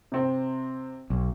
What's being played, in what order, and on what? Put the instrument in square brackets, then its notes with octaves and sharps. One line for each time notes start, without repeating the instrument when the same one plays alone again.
[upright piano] C3 C4
[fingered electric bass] B1